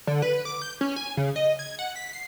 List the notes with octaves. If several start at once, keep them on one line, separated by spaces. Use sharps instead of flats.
D3
B4
D6
G6
C#4
G#5
C#3
D#5
G#6
F#5
B6
C7